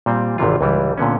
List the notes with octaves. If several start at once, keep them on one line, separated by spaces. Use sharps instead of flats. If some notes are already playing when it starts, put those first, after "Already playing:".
A#2 G3 C4
G#1 G#2 C3 E3 F4
C#2 E3 G3
A#2 D3 B3 C#4